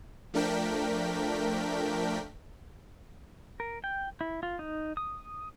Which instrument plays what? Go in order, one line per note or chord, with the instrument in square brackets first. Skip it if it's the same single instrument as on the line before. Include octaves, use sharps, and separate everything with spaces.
[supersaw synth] F3 A3 D4 A#4 G5 B6
[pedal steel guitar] A#4
G5
E4
F4
D#4
D#6